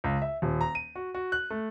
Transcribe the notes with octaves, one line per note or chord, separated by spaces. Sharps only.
C#2
E5
D#1
A#5
D#7
F#4
F#4
F#6
A3